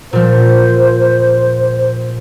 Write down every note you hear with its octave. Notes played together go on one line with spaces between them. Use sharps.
A#2 F3 C5